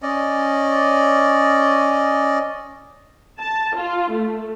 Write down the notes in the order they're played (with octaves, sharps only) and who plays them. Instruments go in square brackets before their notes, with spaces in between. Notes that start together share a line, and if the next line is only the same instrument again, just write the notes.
[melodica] C#4 D5 D#5
[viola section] A5
F4
A3